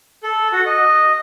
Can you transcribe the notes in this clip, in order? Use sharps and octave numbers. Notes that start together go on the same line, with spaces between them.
A4
F#4
D#5